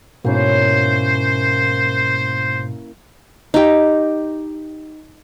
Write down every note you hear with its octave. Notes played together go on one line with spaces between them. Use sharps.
G#2 B2 A#3 C#4 E4 C5
D#4 G4